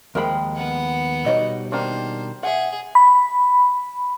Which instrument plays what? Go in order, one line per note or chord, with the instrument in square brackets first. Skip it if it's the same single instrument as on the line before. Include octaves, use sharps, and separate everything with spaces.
[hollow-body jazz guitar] D#2 F3 G#3 [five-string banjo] A#4 G5 B5
[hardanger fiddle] B3 F#5
[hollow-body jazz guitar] B2 G3 D#4 [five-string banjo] F#4 C#5 D#5
[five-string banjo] D#3 A#3 D4 [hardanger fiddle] C5
[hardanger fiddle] G#4 [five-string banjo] E5 F#5
[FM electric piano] B5